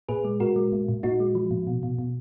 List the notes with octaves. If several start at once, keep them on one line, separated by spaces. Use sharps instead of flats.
A#2 G#4 B4
G#3
A#2 F#4 A#4
G#3
A#2
A#2
A#2 D#4 F#4
G#3
F3
A#2
B2
B2
B2